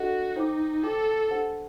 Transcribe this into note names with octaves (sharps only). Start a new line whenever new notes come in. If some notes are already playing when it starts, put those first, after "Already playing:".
Already playing: D4 F#4 A4 D#5 F#5
D#4 C5 G5 D6
A4 C5 G5 D6
D4 G4 C5 F#5